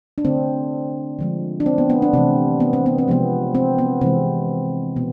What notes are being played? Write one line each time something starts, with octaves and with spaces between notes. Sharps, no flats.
D4
D3 A3 C4
D3 F3 G#3
D4
C4
B3
B3
D4
C3 E3 A3 C4
B3
C4
B3
C4
C3 F3 G#3 B3
C4
B3
C3 E3 G#3 C4
B2 B3